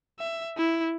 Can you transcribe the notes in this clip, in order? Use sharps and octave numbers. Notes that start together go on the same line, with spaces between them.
E5
E4